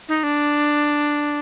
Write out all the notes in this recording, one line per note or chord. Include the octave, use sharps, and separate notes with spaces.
D#4
D4